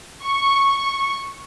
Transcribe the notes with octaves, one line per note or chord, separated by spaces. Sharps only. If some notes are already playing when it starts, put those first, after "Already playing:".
C#6